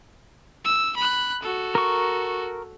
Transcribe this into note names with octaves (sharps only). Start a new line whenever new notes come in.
E6
B5 F#6
F#4 A4
A#4 C#6